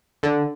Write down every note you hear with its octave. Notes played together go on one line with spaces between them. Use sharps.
D3